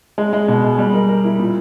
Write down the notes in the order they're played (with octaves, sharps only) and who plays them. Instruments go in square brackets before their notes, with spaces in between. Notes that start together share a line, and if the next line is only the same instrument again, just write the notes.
[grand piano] G#3
G#3
B2
G#4
G3
A#4
A#4
E4
A#2